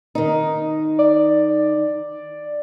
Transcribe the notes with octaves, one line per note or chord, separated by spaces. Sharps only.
D#3 D#4
D5